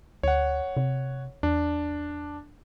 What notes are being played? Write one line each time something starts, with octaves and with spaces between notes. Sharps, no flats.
D2 C#5 F#5
C3
E2 D4